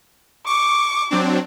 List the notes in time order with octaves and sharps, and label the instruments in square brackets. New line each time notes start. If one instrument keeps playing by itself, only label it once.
[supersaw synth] C#6 [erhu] D6
[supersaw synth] F#3 C4 D4